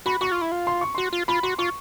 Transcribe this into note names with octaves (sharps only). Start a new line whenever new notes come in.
F#4 B5
F#4 C#6
F4
E4
F4
C6
C#6
F#4 C6
F4
F4 B5
F#4 C6
F4 C#6